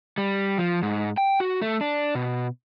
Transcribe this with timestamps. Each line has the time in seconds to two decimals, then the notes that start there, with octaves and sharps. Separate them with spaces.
0.18 G3
0.58 F3
0.82 G#2
1.17 G5
1.40 F#4
1.62 A3
1.81 D4
2.15 B2